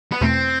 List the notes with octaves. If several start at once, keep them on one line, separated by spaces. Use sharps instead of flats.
B3
E2 B2 A3 C4